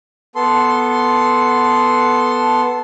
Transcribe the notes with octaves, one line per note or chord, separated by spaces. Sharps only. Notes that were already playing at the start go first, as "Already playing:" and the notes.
B3 A4 C6